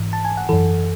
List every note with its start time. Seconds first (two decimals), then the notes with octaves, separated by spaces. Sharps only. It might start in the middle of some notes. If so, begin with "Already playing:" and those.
Already playing: G#2 E3
0.13 A5
0.25 G#5
0.37 F#5
0.49 F#2 E3 A4